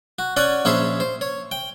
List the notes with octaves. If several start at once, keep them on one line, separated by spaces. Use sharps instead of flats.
F#4
C#4 F#4 D5 F#5 G#5
A#1 C#4 G#4 C5 C#5 E5
C5
C#5
G5